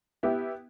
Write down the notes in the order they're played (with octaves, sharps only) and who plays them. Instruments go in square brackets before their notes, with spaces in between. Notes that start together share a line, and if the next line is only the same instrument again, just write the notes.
[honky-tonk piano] B3 E4 G4